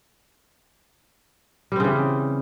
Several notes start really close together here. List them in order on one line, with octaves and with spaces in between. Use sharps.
G3 C4 C#3 E3